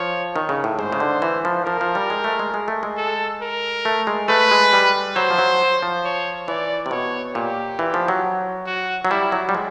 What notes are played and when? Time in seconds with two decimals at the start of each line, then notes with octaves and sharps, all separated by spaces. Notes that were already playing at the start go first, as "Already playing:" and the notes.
Already playing: F3 C#5
0.36 D#3
0.49 C#3
0.64 A2
0.78 G#2 C5
0.92 C#3
1.00 D3
1.22 E3
1.45 F3
1.66 F3 A#4
1.81 F3
1.95 G3
2.10 G#3
2.24 A3
2.39 G#3
2.54 G#3
2.68 A3
2.83 G#3
2.97 A4
3.41 A#4
3.85 A3
4.07 G#3
4.28 A3 B4
4.51 G#3
4.73 G3
5.16 F#3 C5
5.30 F3
5.38 F#3
5.82 F3
6.04 C#5
6.48 E3 D5
6.86 C3
6.91 B2 C#5
7.35 A#2 G4
7.79 E3
7.94 F3
8.08 F#3
8.67 F#4
9.05 F#3
9.10 G3 E4
9.32 F#3
9.49 G3
9.55 G#3